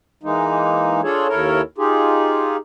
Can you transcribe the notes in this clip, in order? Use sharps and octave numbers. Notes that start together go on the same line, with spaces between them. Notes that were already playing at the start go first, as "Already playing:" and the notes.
E3 G#3 A#3 D#4
D4 F4 G#4 A4 C#5
D#2 E4 A4 A#4 C#5
D#4 F4 G4 G#4